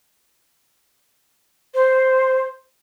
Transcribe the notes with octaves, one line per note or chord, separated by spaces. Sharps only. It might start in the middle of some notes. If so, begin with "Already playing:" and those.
C5